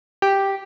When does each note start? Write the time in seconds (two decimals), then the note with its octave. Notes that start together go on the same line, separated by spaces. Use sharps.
0.22 G4